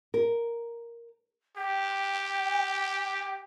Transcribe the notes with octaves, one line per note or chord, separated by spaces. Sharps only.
A#4
G4 G5